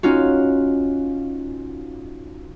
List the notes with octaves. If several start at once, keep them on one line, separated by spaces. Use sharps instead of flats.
C#4 D#4 F4 F#4